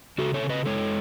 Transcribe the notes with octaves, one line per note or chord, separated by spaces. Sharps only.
C#3 F#4 A4
A4 C#5
C#3
B4 D#5
G#3 A4 C#5